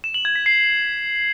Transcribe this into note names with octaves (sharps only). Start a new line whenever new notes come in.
E7
F#7
G#6
B6
C7